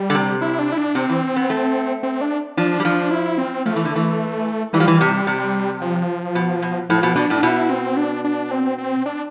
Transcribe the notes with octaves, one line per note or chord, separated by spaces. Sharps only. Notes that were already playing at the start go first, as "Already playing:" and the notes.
Already playing: G3
D3
C3
E4
D4
E4
D4
C3 C4
E3
B3
A3
C4
D4
F3 D4
G3
F3 D4
E4
C4
F3 A3
E3
D3
E3
E3 G3
F3
E3
C3
C3
F3
B2
B2
A2 F3
B2
B2 D4
A2
B2 E4
C4
D4
D4
C4
C4
D4